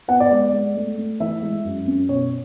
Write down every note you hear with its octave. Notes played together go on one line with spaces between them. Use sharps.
B3 F#5
D5
G#3
G#3
A3
A3
E3 E5
G#3
F#2
C#4
B2 C#5